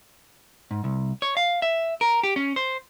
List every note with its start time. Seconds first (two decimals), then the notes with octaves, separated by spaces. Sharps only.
0.71 G#2
0.84 C2
1.22 C#5
1.37 F5
1.62 E5
2.01 A#4
2.23 G4
2.36 C#4
2.56 C5